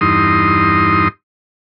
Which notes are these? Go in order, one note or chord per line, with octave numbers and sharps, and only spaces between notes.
E2 G2 D#4 C6 D#6